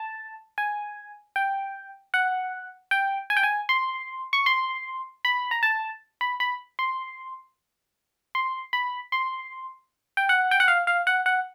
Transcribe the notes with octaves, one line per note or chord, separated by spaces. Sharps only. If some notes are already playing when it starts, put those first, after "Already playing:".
Already playing: A5
G#5
G5
F#5
G5
G#5
G5
G#5
C6
C#6
C6
B5
A#5
A5
B5
B5
C6
C6
B5
C6
G5
F#5
G5
F#5
F5
F5
F#5
F#5